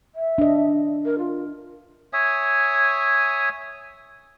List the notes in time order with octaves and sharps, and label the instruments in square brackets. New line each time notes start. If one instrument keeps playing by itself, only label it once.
[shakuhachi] E5
[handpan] D4 D#5
[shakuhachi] A#4
F4
[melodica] C#5 E5 G#5 D#6